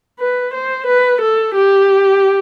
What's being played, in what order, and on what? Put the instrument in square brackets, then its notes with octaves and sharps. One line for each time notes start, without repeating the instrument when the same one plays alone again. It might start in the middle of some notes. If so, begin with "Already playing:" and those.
[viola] B4
C5
B4
A4
G4